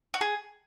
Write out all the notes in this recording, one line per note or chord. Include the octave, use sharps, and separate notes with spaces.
F#4
G#4